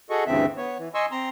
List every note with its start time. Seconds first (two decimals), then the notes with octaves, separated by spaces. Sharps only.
0.10 F#4 G#4 A4 D#5 C#6
0.27 D2 G2 C#3 E3 C4 E5
0.57 B3 C#5
0.79 E3
0.95 D#5 G#5 C6 C#6 E6
1.11 C4 A#5 C6